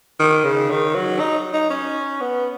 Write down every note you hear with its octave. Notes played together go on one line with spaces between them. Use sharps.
D#3
C#3
D#3
F#3
D#4
D#4
C#4
B3